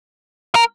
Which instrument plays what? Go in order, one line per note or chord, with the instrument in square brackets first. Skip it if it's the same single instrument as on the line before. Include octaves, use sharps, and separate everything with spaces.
[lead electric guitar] A#4